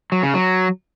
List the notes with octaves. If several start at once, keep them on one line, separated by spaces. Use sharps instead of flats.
F#3
C#3
F#3